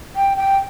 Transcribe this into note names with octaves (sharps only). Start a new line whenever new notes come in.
G5
G5